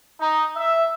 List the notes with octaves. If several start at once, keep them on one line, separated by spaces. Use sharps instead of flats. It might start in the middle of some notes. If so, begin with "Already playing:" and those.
D#4
E5